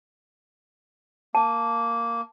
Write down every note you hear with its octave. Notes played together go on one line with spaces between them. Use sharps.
A#3 A5